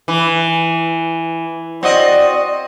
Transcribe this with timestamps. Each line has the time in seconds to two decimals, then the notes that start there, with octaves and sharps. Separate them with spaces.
0.08 E3
1.83 C4 F#4 D5 D#5